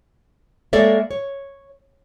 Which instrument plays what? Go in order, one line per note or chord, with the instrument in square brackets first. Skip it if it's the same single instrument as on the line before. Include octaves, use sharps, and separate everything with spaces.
[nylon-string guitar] G#3 A#3 A4 C#5 D5 E5
C#5